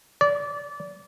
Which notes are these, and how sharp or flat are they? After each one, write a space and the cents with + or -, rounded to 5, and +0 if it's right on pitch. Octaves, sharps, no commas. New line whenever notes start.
D5 -25